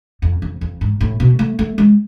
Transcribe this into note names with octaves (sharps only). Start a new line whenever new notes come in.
F2
F2
F2
G#2
A2
B2
A3
A3
G#3